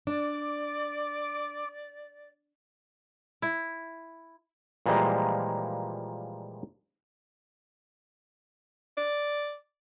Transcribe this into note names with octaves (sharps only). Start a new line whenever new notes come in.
D4 D5 D6
E4
A#2 E3 F3 G3 G#3 A#3
D5